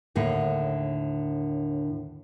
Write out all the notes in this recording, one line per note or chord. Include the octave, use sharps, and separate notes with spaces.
D#2 A2 D3